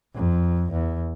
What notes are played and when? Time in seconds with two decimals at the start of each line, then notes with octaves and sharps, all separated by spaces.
0.15 F2
0.72 E2